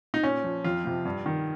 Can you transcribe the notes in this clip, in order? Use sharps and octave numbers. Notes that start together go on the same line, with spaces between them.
D#4
A#2 C#4
F3
F2 F4
C3 F3
G2
D#3